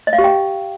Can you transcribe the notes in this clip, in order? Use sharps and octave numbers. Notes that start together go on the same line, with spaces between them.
D#5
F5
G4
G5